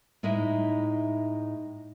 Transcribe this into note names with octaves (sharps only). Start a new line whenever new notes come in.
A2 G#3 D#4 E4 E5